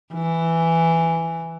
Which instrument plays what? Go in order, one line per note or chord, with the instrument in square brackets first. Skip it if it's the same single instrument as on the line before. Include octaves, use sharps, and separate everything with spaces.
[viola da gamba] E3